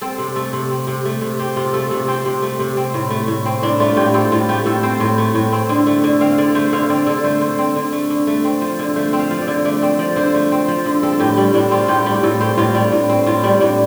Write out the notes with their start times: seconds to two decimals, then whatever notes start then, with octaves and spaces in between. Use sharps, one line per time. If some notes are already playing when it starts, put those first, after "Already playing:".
0.01 C4 A4
0.18 C3
0.36 A3 A4
0.53 C3
0.70 C4
0.87 C3
1.05 A3
1.21 C3
1.39 C4 G4
1.56 C3 F4
1.74 A3 A4
1.90 C3 A4
2.08 C4 G4
2.25 C3
2.42 A3
2.60 C3
2.77 C4
2.94 A2
3.11 A3
3.28 A2
3.46 C4
3.63 A2 D4
3.80 A3 F4
3.97 A2 G4
4.14 C4 A4
4.32 A2 F4
4.49 A3 G4
4.66 A2 A4
4.83 C4 C5
5.00 A2
5.18 A3
5.35 A2
5.52 C4
5.69 D3
5.87 A3
6.04 D3
6.21 C4 F5
6.38 D3 D5
6.55 A3 C5
6.73 D3 F5
6.90 C4 D5
7.06 D3 A4
7.24 A3 C5
7.41 D3 C5
7.59 C4
7.76 D3
7.93 A3
8.10 D3
8.27 A3
8.44 C4
8.62 F3
8.79 D3
8.96 A3 C5
9.13 C4
9.19 F5
9.31 F3
9.42 D5
9.48 D3
9.65 A3 D5
9.82 C4
9.99 F3 D5
10.16 D3 C5
10.35 A3
10.52 C4
10.68 F3
10.85 D3
11.03 C4 A4
11.20 A2 G4
11.37 G3
11.54 A2 D4
11.71 C4 F4
11.88 A2 G4
12.06 G3 G4
12.23 A2 A4
12.41 C4 G4
12.58 A2 F4
12.75 G3 D4
12.92 A2
13.09 C4
13.26 A2 F4
13.44 G3 D4
13.61 A2 D4